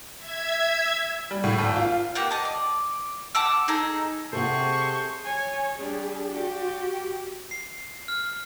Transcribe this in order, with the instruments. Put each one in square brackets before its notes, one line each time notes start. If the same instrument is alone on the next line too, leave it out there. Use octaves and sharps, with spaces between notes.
[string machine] E5 G#6
[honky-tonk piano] G3
A2
G#1
F4
[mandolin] A#3 G4 F#5
D#5 A5
D5
F#5 A5 D6 E6
D#4 G#4 A4 A#5
[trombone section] C3 [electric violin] G#4 C#6 [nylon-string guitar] A4 F#5 [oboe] C5
[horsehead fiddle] C#5 [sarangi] G#5
[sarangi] G3 [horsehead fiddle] D4 G#4
[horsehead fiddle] F#4 [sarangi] G4
[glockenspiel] C7
F6